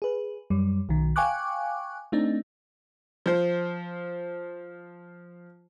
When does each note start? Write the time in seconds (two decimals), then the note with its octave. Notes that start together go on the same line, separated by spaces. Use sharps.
0.02 G#4 B4
0.50 F#2 G3
0.89 B1 D#3
1.16 F5 G5 G#5 C#6 D6 F#6
2.12 A3 C4 D4 D#4
3.26 F3 C5